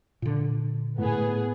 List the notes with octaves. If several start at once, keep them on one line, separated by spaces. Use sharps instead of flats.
A#2 D3
A2 B3 G#4